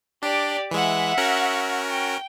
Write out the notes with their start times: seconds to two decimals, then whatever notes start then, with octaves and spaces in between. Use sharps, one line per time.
0.23 D4 G4 D5
0.71 E3 G#3 E5 F#5
1.17 C#4 F#4 A#4
1.90 G5